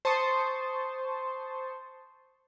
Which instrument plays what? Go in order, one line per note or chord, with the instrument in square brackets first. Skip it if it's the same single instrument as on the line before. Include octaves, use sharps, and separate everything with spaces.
[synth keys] C5 A5 C6 C#6 D#6